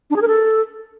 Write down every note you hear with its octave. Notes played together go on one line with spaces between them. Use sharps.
D4
G#4
A#4
A4